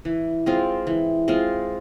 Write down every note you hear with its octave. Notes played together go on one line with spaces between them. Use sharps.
E3
G#3 C4 F4
E3
G#3 C4 F4